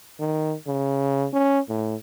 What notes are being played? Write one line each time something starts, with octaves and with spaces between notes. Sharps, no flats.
D#3
C#3
C#4
A2